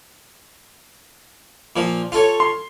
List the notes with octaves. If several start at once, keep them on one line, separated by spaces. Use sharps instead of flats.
A#2 F3
F4 A4 C#5
C6